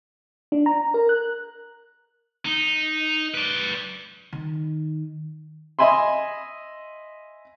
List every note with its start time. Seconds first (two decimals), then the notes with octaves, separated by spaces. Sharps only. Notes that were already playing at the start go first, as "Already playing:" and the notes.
0.52 D4
0.66 A#5
0.94 A#4
1.09 F#6
2.45 D#4
3.34 B4 D5
4.32 D#3
5.79 D#5 E5 G#5 B5 C6